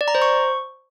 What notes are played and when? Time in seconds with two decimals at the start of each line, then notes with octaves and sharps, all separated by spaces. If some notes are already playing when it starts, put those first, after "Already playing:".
0.01 D5
0.08 A#5
0.15 C5
0.22 C#6